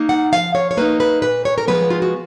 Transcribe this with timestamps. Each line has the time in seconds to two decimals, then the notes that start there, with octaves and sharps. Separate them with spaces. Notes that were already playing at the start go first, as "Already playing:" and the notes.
Already playing: A#3 D#4
0.09 F#5
0.32 F3 F5
0.55 C#5
0.71 C#5
0.77 A#3 D#4 B4
1.00 B4
1.22 A#2 B4
1.45 C#5
1.58 A#4
1.68 F3 G#3 B3 B4
1.90 F4
2.02 F#4